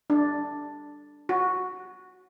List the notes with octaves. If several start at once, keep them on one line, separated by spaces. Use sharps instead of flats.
D4
F#4